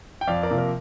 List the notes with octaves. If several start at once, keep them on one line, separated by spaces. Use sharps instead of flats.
G5
F2 D5 F5
A#4 D5
C3 F3 A#3
A#4